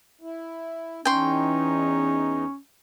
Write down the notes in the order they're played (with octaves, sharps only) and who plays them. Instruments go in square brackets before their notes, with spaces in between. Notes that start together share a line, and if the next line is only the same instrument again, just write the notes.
[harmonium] E4
[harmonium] E2 D#4 [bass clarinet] C#4 [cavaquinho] G5 C6